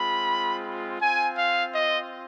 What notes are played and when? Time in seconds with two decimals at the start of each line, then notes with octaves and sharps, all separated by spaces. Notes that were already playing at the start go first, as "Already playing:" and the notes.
Already playing: G#3 C4 F4 B5
1.01 C4 F4 G#5
1.37 F5
1.74 D#5